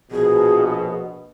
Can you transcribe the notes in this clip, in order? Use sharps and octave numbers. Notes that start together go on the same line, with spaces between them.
A#1 B2 G#4